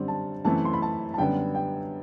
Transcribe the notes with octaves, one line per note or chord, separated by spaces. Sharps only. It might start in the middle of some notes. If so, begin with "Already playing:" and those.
Already playing: F#2 D3 G3 C4
A5
F#2 E3 A3 C4 A5
C6
B5
A5
A5
F#2 D3 G3 B3 G5
G5